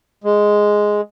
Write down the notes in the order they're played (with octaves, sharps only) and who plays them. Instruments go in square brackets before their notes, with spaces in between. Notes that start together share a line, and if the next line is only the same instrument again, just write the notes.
[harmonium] G#3